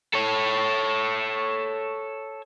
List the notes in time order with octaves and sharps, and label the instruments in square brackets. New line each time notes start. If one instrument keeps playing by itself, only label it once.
[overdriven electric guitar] A4 C#5